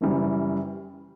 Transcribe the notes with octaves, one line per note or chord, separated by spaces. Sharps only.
F#1 F#2 E3 G3